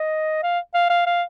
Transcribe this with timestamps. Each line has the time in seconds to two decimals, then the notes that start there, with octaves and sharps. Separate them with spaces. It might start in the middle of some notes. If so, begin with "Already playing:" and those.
Already playing: D#5
0.43 F5
0.74 F5
0.90 F5
1.06 F5